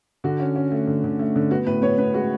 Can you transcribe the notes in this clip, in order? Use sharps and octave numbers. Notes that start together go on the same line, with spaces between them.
D3 F#4
C#4
C#4
A3
D3
D3
A3
D3
B3 F#4
A2 B4
B3 C#5
B3 B4
G#3 F#4